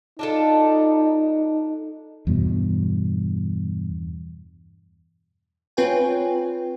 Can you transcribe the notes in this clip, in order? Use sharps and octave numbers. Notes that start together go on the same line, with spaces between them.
D4 D#4 F4 A4
E2 G2 B2
C4 F4 B4 C#5 G5 G#5